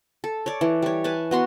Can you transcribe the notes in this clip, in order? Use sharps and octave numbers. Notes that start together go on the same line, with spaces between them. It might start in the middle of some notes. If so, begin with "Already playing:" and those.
A4
C#5 D5
E3
G3 C#5
B4 G#5 A5
B3 F#4 C6